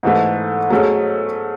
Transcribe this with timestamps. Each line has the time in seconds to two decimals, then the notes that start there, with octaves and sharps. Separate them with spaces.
0.03 G#2 E3 A3
0.70 F#3 A3 C#4 G#4